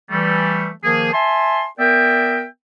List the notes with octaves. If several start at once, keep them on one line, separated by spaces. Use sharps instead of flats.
E3 G3 A3
D#3 F3 A#3 G#4
E5 G#5 A5 C6
B3 A#4 D5 E5 G5